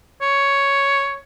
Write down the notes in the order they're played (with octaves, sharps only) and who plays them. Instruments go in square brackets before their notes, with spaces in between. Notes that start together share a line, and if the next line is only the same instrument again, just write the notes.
[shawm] C#5